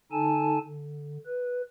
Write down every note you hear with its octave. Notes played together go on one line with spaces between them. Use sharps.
D3 D#4 A4 G#5 A5
D3
B4